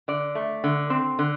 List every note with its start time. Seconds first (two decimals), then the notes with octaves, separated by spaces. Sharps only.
0.08 D3 D5
0.35 A3
0.64 D3
0.90 C4
1.19 D3